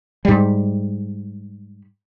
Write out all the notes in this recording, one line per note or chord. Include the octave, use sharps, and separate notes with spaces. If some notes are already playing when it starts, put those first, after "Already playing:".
G#2 G3